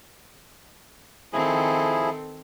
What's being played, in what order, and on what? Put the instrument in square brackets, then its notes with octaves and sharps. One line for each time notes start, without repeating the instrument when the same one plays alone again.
[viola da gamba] D#3 C4 A4 [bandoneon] F3 E4 G#4